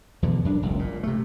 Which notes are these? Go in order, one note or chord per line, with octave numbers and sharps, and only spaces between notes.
E2 B2 D3
F#2 D4
F#1 C#2
A#2
C3 A3